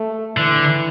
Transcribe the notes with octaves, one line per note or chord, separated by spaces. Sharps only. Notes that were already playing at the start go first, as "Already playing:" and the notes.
Already playing: A3
D3 E3